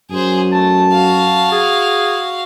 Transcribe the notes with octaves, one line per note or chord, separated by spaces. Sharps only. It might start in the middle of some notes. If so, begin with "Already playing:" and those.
F#2 G#4 C5
A3 A5
F#4 F5
G#4